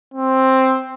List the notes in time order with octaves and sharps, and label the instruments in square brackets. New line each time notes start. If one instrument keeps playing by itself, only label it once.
[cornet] C4